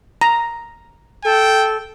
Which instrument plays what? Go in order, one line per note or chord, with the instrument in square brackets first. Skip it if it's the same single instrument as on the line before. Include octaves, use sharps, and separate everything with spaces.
[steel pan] A#5
[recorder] A4 [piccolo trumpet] G5